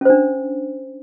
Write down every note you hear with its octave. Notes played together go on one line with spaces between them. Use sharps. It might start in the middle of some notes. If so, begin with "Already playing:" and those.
C#4 D4 C5